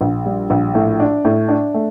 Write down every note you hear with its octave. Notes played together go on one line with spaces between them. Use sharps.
A#1
G3
A#1
A2
D4
A2
D4
A3